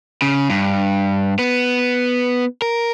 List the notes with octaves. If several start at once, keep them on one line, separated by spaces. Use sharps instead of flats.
C#3
G2
B3
A#4